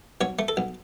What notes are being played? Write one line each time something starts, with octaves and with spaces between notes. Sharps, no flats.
B1 C#5
A3
A4
B1